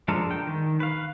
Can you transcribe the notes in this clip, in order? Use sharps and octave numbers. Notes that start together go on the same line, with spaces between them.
F3 G#3 D4 A4 A#4
G5
D#3
B4 F5